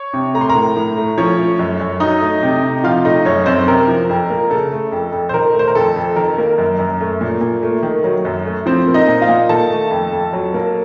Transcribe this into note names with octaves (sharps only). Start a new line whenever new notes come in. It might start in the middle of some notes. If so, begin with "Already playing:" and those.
Already playing: C#5 C#6
C3
A3 A#5
C6
A#4 A#5
A2
A2
A3
F3 C#4 C#5
A3
F#2
F#2
F#3 D#4 D#5
A3
C3
C3
F3 F4 F5
A3 D#4 D#5
F#2 C#4 C#5
F#2 C4 C5
C3 A#4
F3
F2
A#3
C#3 A4
A3
F2
F2
C5
D#3 A#4
A3 C5
A#4
F2 A4
F2
D#3 A#4
A#3
F#2
F#2
A3
A#2
A#2
A3
D#3
F#3
F#2
A3
F3 C4 C5
A#3
D#4 D#5
A#2
F4 F5
A#2
D#3 A4 A5
A3
F2
F2
F#3
A#3